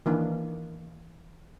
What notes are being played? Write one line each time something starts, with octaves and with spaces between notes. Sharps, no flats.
D#3 E3 A#3 D4